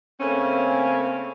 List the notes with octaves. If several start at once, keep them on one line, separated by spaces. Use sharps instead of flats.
C#3 A3 A#3 C4 C#4